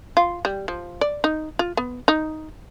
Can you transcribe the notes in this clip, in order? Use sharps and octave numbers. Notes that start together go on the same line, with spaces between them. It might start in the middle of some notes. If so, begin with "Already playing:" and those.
F4
G3
F3
D5
D#4
F4
B3
D#4